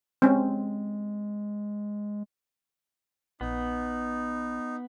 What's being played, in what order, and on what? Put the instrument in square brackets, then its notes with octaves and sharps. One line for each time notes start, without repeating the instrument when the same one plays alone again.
[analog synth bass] G#3 [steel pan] C4 C#4
[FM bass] A#1 [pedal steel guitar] B3 [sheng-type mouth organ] D#4